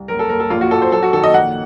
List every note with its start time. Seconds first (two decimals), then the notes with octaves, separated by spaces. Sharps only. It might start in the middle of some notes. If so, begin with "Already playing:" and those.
Already playing: C2
0.08 F#1 A#4
0.19 A4
0.29 F#1 A#4
0.40 A4
0.50 A#1 F4
0.61 F#4
0.71 A#1 A4
0.82 C5
0.92 F#2 A4
1.03 F#4
1.13 D#3 A4
1.24 D#5
1.34 A#1 F#5